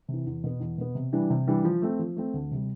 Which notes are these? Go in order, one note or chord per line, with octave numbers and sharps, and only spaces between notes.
C3 E3
E2
B2 B3
E2
B2 B3
C3
E3 G3 D4
C3
E3 G3 D4
F3
A3 C4
F3
A3 C4
D2
C3 G3